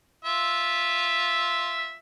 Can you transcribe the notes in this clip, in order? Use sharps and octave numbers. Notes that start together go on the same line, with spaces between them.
F4 E5